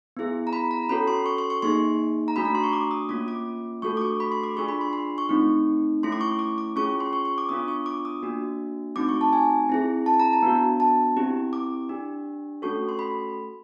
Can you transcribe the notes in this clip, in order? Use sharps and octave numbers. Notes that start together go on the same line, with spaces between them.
B3 E4 G#4
A#5
B5
A#5
C#4 F#4 A4 B5
C6
C#6
C6
C#6
A#3 D#4 G#4 C6
A#5
A3 D4 F#4 B5
A#5
C6
C#6
D6
D#6
A#3 C#4 F4 D6
D6
A3 D4 F#4 A4 C#6
D6
C#6
B5
C6
D6
D4 F4 G#4 C#6
B5
C6
C6
C#6
A3 C4 D#4
A3 C#4 E4 C6
D6
C#6
D6
D6
C#4 F4 G#4 C#6
C6
C#6
C#6
D6
B3 D4 F4 D#6
C#6
D6
D#6
A#3 D4 F#4
A3 C4 D#4 F#4 D6
C#6
A5
G#5
C4 E4 G#4
A5
A#5
A5
B3 D4 F#4
A5
C4 E4 G4
D6
D4 G4
A3 C#4 F#4 A4 C#6
C6
B5